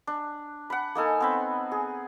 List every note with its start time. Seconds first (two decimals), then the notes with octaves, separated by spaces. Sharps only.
0.07 D4
0.70 F#5 B5
0.95 A#3 D#4 A4 G#5
1.20 B3 C4 B5
1.72 G#4